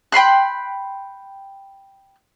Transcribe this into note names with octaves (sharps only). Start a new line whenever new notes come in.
G5 B5 C6 F#6